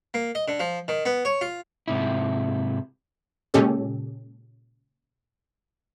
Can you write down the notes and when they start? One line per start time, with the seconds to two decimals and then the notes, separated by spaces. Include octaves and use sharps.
0.14 A#3
0.35 D#5
0.48 D3
0.60 F3
0.88 D#3
1.05 B3
1.25 C#5
1.41 F4
1.88 G#2 C3 E4
3.54 A#2 C#3 G#3 C#4 G4 A4